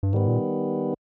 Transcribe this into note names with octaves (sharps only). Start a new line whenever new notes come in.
G2
G#2 D#3 G3 B3
A#2